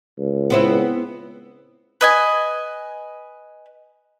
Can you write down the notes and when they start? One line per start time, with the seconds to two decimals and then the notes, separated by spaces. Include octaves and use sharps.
0.19 C#2
0.50 B3 C4 E4
2.01 B4 D#5 G#5